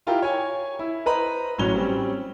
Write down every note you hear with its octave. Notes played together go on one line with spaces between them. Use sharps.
E4 F4 G4 A#4 G5
C#5 G#5
E4
B4 C5 D#5 A#5 B5
A1 F#3 C#4 F7 G7
G3 C4 C#4